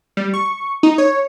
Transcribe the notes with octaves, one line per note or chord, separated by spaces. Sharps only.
G3
C#6
D#4
C#5